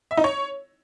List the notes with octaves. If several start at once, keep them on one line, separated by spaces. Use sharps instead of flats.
E5
D#4
C#5